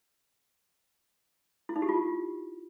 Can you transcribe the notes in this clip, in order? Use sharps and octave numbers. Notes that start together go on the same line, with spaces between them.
E4
D#4
G4
F4